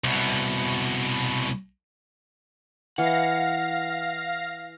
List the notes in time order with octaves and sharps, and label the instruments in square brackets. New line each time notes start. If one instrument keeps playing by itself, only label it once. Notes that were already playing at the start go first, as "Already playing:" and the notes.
[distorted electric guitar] C2 B2
[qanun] E3 [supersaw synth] F5 A#6 [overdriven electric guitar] F#5